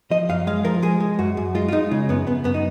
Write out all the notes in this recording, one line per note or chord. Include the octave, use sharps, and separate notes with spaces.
F3 D#5
F#2 F5
G#3 F5
F3 A#4
G#3 G#4
G#3
F#2 F#4
F#2
G#3 F4
F4
G#3 D#4
C#3
F#2 B3
F#2 B3
F#2 B3
D#4